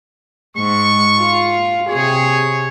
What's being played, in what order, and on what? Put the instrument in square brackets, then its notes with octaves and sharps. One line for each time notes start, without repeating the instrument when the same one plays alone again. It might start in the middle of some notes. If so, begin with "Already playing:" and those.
[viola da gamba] G#2 [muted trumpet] C#6
[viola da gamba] F4
[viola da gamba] C3 G#4 [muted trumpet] C#5